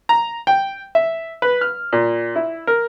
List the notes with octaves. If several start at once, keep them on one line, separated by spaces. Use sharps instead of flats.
A#5
G5
E5
B4
F6
A#2
E4
A#4